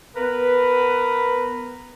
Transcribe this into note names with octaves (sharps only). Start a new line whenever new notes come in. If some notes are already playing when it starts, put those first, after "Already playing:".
B3 A#4 B4